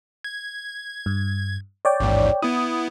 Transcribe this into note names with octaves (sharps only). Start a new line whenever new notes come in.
G#6
G2
C#5 D5 G5
A1 D#2 G#2
B3 E4 D#6